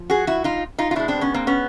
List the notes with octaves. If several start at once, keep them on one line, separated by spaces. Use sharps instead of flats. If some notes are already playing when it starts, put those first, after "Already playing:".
Already playing: F3
F#4 G#4
E4 F#4
D#4 F4
D#4 F4
F4
B2 G#3 D4 E4
C4 D4
B3 C#4
A#3 C4
B3 C#4